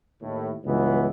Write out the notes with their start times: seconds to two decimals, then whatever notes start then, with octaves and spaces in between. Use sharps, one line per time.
0.21 D#2 A2
0.64 C#2 G2 E3 F#3 B3